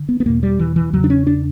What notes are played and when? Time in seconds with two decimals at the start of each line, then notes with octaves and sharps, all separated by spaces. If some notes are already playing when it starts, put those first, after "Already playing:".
Already playing: D3
0.09 B3
0.20 B3
0.25 E2 B2 A#3
0.43 G3
0.59 E3
0.76 E3
0.93 E2 C#3 F#3
1.04 D4
1.10 C#4
1.27 D4